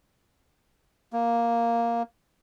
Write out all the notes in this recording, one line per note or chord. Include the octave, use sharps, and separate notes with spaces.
A#3